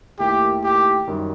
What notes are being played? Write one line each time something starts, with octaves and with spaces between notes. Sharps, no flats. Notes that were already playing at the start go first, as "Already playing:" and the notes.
D#2 D#3 A3 E4 G4
G4
F#2 D#3 G3